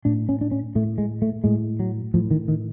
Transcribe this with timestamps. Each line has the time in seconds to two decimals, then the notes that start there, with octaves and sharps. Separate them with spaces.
0.05 A2 D4
0.29 C#4
0.41 D4
0.51 C#4
0.75 A2 A3
0.98 G#3
1.22 A3
1.44 A2 G#3
1.80 F#3
2.14 A2 F3
2.31 D#3
2.48 D#3